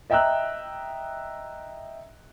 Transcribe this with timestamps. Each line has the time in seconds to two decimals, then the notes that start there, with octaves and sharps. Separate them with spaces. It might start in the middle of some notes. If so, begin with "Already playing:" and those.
0.10 D#5 E5 G5 A#5 E6 F#6